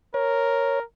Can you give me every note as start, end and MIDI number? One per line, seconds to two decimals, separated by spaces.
0.14 0.83 70
0.14 0.80 73